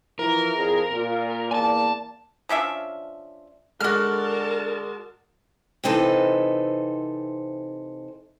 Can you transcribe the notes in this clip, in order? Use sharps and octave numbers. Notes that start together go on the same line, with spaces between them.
E3 F3 E4 A#4
F2 E4 G#4
A#2
E2 A#3 D5 G#5 A5
F3 C#4 D4 E5
D3 G#3 F#4 A#4 D5 A5 F6
C3 E3 C4 D#4 A4 B4